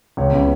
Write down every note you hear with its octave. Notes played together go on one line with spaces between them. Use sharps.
C#2 C#5
C#3 G#3 B3